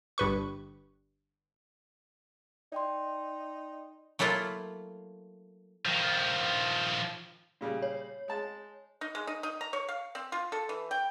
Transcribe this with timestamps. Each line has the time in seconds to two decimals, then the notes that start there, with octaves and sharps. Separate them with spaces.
0.18 G1 G2 B4 C#6
2.72 D#4 D5 G5 C6
4.19 F#3 A3 A#3 E4 F4
5.86 D#3 F3
7.61 A#2 C#3 G3
7.82 C#5
8.28 G#3 A5
9.01 D#4
9.15 G#3
9.27 D#4
9.43 D#4
9.61 A#5
9.73 C#5
9.88 F5
10.15 C4
10.32 F4
10.52 A4
10.69 E3
10.91 G5